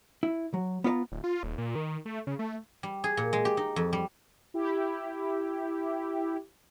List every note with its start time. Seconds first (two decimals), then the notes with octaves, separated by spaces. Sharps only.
0.23 E4
0.54 F#3
0.84 B3 F4 C#5 A#5
1.12 D1
1.24 F4
1.43 D#1
1.58 A#2
1.75 D#3
2.05 A3
2.27 C#3
2.39 A3
2.83 G3
3.04 G#4
3.17 A#2
3.33 G#3
3.45 G4
3.57 D#4
3.76 F2
3.93 G3
4.54 E4 G4